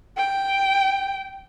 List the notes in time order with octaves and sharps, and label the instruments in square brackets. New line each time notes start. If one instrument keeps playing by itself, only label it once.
[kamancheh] G5